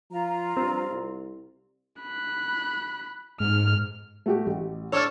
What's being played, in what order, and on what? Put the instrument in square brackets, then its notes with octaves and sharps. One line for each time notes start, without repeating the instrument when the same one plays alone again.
[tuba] F3 [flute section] F4 A#5
[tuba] G2 [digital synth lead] C4
[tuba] C2
[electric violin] B5 F#6
[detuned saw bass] G#2 [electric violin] F6
[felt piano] A3 F#4 G4
A1
[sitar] D4 A4 C#5 [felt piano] E6 F6